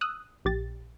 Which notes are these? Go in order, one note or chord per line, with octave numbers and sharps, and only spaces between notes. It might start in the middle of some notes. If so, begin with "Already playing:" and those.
D#6 E6 F#6
A#1 G4 A6